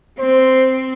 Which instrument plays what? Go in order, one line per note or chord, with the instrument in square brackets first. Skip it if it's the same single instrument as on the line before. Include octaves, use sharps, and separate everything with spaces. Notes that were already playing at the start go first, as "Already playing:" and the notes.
[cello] C4 [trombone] C5